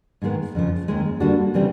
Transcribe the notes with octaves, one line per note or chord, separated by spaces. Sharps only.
G#2 D#3 G#3 B3
F2 C#3 F3
D#2 D#3 G#3
D3 G3 A#3 D4 F#4
C#3 E3 G3 C4